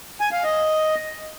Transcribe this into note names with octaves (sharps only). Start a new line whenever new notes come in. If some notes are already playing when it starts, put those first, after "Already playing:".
G#5
F5
D#5